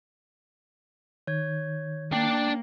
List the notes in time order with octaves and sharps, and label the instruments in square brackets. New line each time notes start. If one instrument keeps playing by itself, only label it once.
[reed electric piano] D#3 [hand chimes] C#5 G#6
[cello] A#3 [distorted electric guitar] D4 D5 [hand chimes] G5